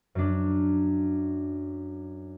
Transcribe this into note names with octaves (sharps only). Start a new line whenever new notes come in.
F#2 D4